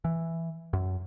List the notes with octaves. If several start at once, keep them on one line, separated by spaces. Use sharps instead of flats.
E3
F#2